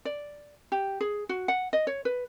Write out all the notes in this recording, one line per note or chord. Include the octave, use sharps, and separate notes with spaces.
D5
G4
G#4
F#4
F#5
D#5
C#5
B4